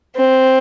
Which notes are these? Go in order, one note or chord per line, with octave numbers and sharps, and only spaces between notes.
C4